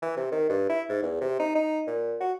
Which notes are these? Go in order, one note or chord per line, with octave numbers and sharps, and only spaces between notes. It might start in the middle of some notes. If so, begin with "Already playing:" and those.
E3
C3
D#3
G2
E4
G#2
E2
C3
D#4
D#4
A#2
F#4